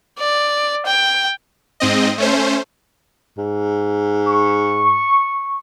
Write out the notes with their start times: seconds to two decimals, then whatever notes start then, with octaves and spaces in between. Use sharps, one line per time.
0.19 D5
0.85 G5
1.80 G#2 C4 D#5
2.18 A3 C#4 C5
3.38 G#2
4.27 C#6